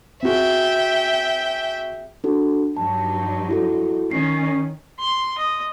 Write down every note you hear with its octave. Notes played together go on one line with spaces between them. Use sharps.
C4 F#4 G#4 E5 G5
D4 F#4 A4
G2 F#3 D#4 A5
E4 F#4 A4
D#3 C#4 C7
C6
D#5